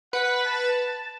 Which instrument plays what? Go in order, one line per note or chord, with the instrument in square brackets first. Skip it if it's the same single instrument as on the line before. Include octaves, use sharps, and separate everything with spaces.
[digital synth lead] B4 [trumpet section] F#5
[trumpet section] A5